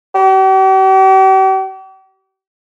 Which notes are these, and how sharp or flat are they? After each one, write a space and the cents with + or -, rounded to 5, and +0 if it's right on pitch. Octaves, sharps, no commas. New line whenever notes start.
G4 -45